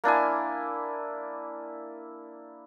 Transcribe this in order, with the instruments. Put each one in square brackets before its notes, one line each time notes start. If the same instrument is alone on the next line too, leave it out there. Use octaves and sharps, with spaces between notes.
[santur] A#3 D4 E4 G#5